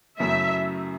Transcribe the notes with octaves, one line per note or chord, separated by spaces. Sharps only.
F#2 C#3 F#3 A3 E4 E5